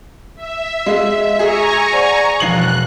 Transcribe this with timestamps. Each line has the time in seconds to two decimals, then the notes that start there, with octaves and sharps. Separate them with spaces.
0.36 E5
0.86 G#3 F5
1.39 G#4 G#5 A#5 C#6
1.93 C5 D5 F#5
2.40 E1 B2 F3 F#6 C7 F#7